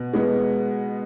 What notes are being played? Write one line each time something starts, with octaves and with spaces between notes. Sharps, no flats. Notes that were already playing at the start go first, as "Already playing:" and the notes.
Already playing: B2 B4
G#3 B3